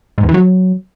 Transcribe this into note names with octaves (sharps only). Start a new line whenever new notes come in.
G#2
E2
E3
F#3